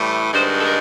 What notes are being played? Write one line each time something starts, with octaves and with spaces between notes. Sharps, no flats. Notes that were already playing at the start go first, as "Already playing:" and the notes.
Already playing: A2 E3 G3
G2 D#3 G#3 C5
A4
A#4